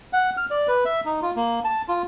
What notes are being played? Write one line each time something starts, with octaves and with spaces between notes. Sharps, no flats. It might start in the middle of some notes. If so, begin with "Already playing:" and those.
F#5
F6
D5
B4
E5
D#4
F4
A#3
A5
F4